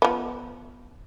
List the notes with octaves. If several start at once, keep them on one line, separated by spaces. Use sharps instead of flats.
F3 B3